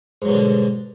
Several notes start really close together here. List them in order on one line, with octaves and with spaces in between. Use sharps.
G#2 F#3 B2 G3 D3